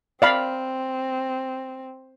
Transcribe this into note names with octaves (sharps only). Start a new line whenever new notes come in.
C4 D5 F5 B5